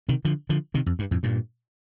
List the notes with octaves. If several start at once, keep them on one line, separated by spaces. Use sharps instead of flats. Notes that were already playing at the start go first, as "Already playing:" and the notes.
C3 D#3
D3 F3
D3 F3
C3 D#3
F2
G2
F2 A2
G2 A#2